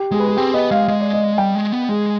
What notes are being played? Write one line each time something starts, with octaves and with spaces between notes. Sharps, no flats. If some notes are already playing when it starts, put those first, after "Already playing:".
Already playing: G4
G#3 G#4
B4
G#4
C4 G4
B3 D#5
G#3 F5
G#3 D#5
D5
D#5
G3 G5
G#3
B3
G#3 G#4